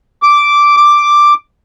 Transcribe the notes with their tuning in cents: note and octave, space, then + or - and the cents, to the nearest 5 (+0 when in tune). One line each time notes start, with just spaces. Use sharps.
D6 -5
D6 +5